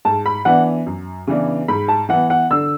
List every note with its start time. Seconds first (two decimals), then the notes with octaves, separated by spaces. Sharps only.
0.05 G#2 A5
0.26 B5
0.45 E3 B3 D4 F#5
0.86 F#2
1.27 C#3 E3 B3 D4
1.68 G#2 B5
1.88 A5
2.09 E3 B3 F#5
2.30 F#5
2.51 D3 E6